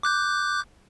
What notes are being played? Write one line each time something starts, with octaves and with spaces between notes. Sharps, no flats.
D6 F#6 G6